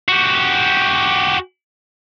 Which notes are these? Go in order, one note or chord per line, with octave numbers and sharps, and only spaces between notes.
F#4 G4